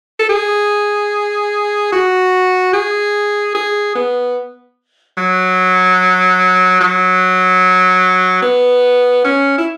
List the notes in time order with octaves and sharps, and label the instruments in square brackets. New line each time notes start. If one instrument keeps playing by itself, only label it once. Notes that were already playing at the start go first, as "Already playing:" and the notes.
[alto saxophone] A4
G#4
F#4
G#4
G#4
B3
F#3
F#3
B3
C#4
E4